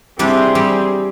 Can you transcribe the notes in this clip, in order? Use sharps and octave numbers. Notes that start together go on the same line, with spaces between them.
G3 C4 D4 E4 G#4
G3